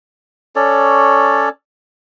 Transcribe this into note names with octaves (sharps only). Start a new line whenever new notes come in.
C#4 A4 C#5 D5